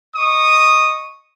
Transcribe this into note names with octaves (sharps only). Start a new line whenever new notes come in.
D#5 C#6 D#6